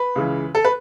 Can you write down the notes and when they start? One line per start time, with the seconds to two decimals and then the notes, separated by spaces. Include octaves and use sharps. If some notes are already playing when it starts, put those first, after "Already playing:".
Already playing: B4
0.15 C#2 C#3 E3
0.55 A4
0.65 B4